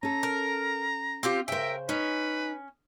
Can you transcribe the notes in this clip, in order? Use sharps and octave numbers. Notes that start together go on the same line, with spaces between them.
C#4 A4 A#5
A#4
C4 F4 G4
C#3 A#4 C5 E5 G5
C#4 D#4 B4